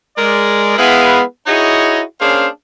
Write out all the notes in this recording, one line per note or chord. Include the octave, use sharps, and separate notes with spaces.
G#3 A#4 D5
G#3 B3 E4 G#4 B4 F5
D#4 E4 F#4 G#4 C#5 D#5
A#3 C#4 D4 G#4 C5 F5